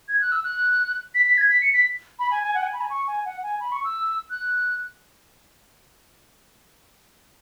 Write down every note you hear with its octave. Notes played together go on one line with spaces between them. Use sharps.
G#6
F#6
E6
F#6
B6
B6
G#6
B6
C#7
B6
B5
G#5
G#5
F#5
G#5
B5
G#5
C#6
G#5
F#5
G#5
B5
C#6
E6
F#6